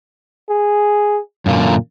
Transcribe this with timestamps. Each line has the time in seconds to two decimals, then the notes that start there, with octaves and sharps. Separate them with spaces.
0.49 G#4
1.46 F#2 A#2 D3 A#3